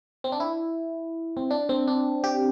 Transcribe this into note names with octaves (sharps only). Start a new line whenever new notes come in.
C4
D4
E4
C4
D4
C4
D4
G4